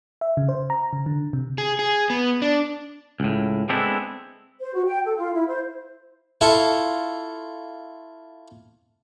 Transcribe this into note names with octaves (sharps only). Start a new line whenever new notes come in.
E5
C#3
C5
A#5
C#3
D3
C3
G#4
G#4
B3
D4
C#2 A2
G#3 B3 C4 D4 E4 A4
C5
F#4
G5
A4
F4
E4
C5
E4 F4 A4 E5 C#6